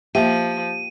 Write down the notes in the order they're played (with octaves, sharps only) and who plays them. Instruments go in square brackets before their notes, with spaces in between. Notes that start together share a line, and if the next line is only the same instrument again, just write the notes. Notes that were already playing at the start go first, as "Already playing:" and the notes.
[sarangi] F3 [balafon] A#3 E5 [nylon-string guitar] G4 [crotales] D#7